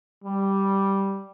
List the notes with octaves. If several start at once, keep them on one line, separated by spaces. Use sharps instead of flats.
G3